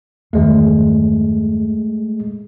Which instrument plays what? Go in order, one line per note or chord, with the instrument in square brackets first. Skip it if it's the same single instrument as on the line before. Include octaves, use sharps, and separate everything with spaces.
[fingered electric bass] E2 G2 D#3 [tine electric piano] G#3 A3